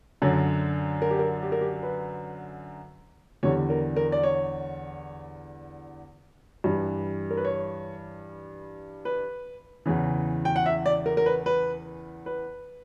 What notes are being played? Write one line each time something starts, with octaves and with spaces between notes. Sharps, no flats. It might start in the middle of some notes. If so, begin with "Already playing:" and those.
F#2 D3 F#3
A#4
G4
A#4
G4
A#4
G4
B4
E2 D3 G3 C#5
A#4
A#4
D5
C#5
G2 E3 G3
A#4
B4
C#5
B4
E2 C#3 E3
G5
F#5
E5
D5
A#4
A#4
B4
B4
B4